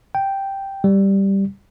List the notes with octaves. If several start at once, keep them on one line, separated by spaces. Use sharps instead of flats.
G5
G3